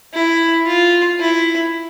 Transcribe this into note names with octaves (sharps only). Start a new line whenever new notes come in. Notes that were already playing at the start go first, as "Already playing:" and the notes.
E4
F4
E4